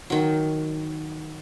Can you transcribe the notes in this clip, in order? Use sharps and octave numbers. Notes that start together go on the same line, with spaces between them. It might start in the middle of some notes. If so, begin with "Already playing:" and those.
D#3 F#3